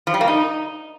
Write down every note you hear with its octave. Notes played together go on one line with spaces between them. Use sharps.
F3
G3
A#3
D#4